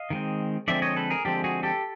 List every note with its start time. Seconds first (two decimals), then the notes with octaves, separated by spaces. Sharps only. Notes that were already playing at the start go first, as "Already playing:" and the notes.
Already playing: D#5 F5
0.10 D#3 G#3 C4
0.68 D3 F3 G#3 C4 D5 E5
0.82 C#5 D#5
0.96 A4 B4
1.10 G#4 A#4
1.25 D3 F3 G#3 C4 G4 A4
1.44 F#4 G#4
1.63 G4 A4